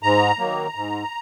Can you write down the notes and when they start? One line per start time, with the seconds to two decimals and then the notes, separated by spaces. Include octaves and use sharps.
0.03 G#2 A#5
0.38 D#3 F#3 A#3
0.75 G#2